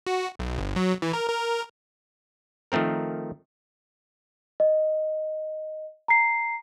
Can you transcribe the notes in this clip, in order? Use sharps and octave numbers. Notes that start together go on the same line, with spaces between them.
F#4
B1
G1
F#3
E3
A#4
A#4
D#3 F3 A3 C4 A#4
D#5
A#5 C7